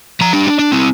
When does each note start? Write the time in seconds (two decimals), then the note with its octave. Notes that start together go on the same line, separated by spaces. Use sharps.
0.21 F3 A#5
0.33 G3 D4
0.48 D4
0.59 D4
0.72 C4 E4